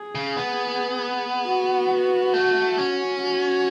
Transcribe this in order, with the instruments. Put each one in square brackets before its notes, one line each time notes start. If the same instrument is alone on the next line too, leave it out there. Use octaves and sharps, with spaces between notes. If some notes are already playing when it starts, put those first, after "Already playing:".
Already playing: [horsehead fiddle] G#4
[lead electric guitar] C#3
B3
[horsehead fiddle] F#4
[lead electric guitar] A3
C#4
[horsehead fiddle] F#4